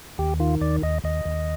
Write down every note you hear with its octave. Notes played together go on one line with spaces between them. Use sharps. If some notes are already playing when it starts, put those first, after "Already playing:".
D#2 G4
D#3 F4
D#2 D5
D#2 D#5
D#2 D#5
D#2